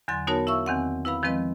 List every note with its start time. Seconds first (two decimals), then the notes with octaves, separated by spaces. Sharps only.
0.08 E2 D3 F#3 C6 A6
0.27 B3 D#4 F#4 A#4 C#5 A5
0.47 E4 E5 F5 C#6 E6
0.66 E2 D#3 C4 F#5
1.05 E4 B4 F5 B5
1.23 D#3 F3 G#3 C4 B4 D#5